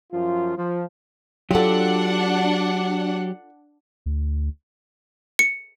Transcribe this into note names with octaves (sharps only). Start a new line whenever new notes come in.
F#2 F3 F4
F3
F#3 D4 F4 G4 A4 F#5
D2
C#7